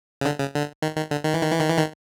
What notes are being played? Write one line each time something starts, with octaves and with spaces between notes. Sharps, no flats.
C#3
D3
C#3
D3
D#3
D#3
D3
D#3
E3
D#3
E3
D#3
E3
D#3